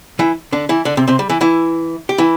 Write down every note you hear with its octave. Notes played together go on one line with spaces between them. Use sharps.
E3 E4
D3 D4
E3 E4
D3 D4
C3 C4
C3 C4
G3
E3 E4
E3 E4
G4
E3 E4